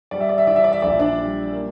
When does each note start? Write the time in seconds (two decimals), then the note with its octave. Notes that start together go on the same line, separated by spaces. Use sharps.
0.11 G3 D5
0.20 E5
0.29 D5
0.38 E5
0.47 E3 D5
0.56 E5
0.64 D5
0.73 E5
0.82 A#1 D5
0.90 E5
0.99 D4 D5
1.18 G3
1.52 A#3